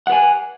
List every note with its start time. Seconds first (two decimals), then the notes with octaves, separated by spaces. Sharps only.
0.07 F#5
0.10 B4
0.12 G#5